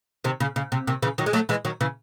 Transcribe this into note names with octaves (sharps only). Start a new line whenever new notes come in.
C3 D#3
C#3
C#3
C3
C3 D#3
C#3 E3
D#3 F#3
G#3
F#3 A3
E3 G#3
D#3 F#3
C#3 E3